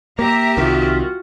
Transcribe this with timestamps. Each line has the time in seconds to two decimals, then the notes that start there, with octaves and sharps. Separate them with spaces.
0.19 A#3 G4 E5 A#5
0.57 C2 C3 D#3 F4 F#4